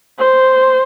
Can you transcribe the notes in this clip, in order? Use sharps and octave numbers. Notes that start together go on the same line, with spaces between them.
C5